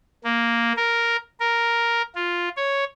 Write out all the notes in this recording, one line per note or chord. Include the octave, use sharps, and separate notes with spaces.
A#3
A#4
A#4
F4
C#5